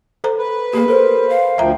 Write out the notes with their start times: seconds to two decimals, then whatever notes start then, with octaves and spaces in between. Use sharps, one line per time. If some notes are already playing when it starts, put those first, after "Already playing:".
0.24 A4 C5 A#5
0.38 B4
0.73 A#3 G4 G#4
0.88 A4 A#4 C5
1.29 F5
1.58 D2 F3 E5 G5 A#5